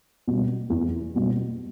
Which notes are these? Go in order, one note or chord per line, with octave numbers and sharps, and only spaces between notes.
B2 G3
E2
B2 G3